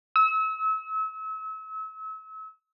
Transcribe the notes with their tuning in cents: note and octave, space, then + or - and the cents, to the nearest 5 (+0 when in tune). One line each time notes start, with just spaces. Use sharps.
E6 -35